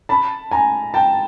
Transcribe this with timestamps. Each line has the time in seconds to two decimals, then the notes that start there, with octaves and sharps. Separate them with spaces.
0.09 A5 B5
0.51 G#5 A#5
0.94 G5 A5